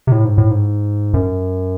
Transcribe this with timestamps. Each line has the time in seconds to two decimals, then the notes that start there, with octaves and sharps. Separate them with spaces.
0.07 C3
0.12 A2
0.25 G#2
0.38 A2
0.51 G#2
1.14 F#2